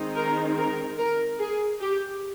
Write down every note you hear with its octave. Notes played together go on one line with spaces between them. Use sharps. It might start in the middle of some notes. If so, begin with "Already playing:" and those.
Already playing: D#3 G#3 C4 D#4
A#4
A#4
A#4
G#4
G4